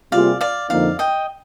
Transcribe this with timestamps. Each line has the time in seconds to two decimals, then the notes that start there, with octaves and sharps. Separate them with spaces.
0.12 C3 G3 A#3 F4 G#4 D5 F5
0.41 D5 F5
0.70 F2 D3 F3 A#3 D#4 D5 F5
0.99 D#5 G5